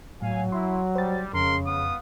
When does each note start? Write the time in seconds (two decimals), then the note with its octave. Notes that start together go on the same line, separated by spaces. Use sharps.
0.22 A2 F#3 F5 G#5
0.52 E4 C6
0.95 G3 C5 A6
1.33 F2 C#3 G#3 A#4 C6
1.66 B3 F5 D#6